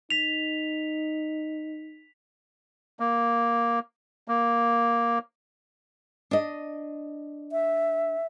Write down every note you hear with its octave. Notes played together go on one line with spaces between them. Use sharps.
D#4 B6 F7
A#3
A#3
D4 D#5
E5